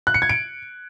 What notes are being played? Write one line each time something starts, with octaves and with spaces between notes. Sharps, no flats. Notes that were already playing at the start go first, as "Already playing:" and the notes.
F#6
C#7
G#6
D7